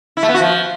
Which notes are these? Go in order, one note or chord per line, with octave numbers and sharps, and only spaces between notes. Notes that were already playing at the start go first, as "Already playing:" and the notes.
E4
A3
B3
F#4
F3